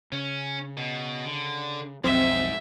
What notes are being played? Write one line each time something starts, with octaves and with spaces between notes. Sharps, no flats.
C#3 C#4
B2
D3
B1 F2 G#2 F#3 C4 E5